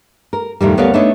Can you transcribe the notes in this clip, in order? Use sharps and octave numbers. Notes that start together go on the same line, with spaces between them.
A#4
F2 A2 D#3 G3
D2 B3 A#4 C#5 D5 F5
A3 B3 D4 D#4 B4 C#5